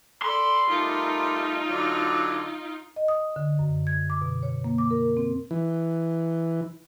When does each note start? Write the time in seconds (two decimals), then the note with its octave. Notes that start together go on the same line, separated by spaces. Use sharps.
0.22 A4 D5 B5 C6
0.70 G3 A3 D#4 F4 A#4
1.69 D3 F#3 D5
2.96 D#5
3.08 D#6
3.36 D3
3.59 F#2
3.87 G#6
4.10 D6
4.22 B2
4.43 C#5
4.64 A#3
4.78 D6
4.91 A#4
5.17 C4
5.51 E3